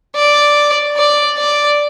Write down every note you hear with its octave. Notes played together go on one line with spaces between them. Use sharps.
D5
D5
D5